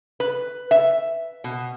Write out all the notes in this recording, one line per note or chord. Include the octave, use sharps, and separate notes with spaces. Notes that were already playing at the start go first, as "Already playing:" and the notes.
B4
E5
B2